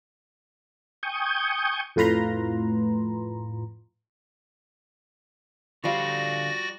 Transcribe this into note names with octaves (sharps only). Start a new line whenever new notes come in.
G5 G#5 C#6 D#6 G6
F2 A2 F4 B4 A#5 C6
D3 F3 G3 F#4 D5 F5 A#6